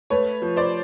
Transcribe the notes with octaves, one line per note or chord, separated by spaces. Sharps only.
A3 B4 C#5
F3
C5 D5